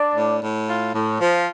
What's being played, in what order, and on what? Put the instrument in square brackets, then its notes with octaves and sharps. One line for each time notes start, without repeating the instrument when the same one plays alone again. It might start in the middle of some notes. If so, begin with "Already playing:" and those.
Already playing: [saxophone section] D4 [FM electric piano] D5
[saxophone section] A2
A2
F4
A2
F3